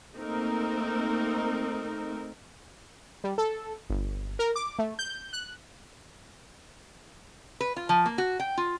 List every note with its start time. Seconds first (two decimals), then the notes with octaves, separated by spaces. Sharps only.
0.16 A3 A#3 C4 D#4 A#4
3.24 G3
3.38 A4
3.90 G1
4.39 A#4
4.56 D6
4.79 A3
4.99 G6
5.33 F#6
7.61 B4
7.76 F4
7.89 F3
8.06 A#3
8.18 F#4
8.40 G5
8.57 F4